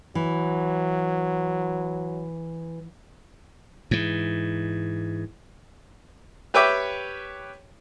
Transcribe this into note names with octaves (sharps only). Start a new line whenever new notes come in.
E3 F#3
G#2 E3
G4 B4 C#5 E5 G5 D6